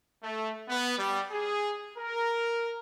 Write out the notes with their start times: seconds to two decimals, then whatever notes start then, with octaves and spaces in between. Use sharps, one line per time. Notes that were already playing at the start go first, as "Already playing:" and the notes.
0.23 A3
0.69 B3
0.99 G3
1.31 G#4
1.98 A#4